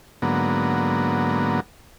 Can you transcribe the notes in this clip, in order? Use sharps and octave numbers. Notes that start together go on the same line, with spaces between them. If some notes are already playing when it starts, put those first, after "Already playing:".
G#2 D3 F#3 A#3 B3